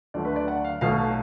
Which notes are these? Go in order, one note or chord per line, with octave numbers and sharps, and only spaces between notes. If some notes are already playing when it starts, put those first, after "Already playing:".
D2 D3 F#3 A3 D5
B4
D5
F#5
F5
B1 B2 F#3 A3 F5